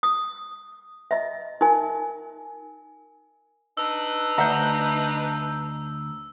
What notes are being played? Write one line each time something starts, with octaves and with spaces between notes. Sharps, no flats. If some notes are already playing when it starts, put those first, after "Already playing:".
D#6
D#5 E5
D#4 A#4 G#5
D4 D#4 B4 E6
D2 E5 F#5 A#5 G6